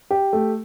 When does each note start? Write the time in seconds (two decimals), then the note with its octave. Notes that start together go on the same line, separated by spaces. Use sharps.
0.11 G4
0.33 A3